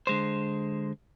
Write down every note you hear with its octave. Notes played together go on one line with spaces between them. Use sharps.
D3 G#3 C5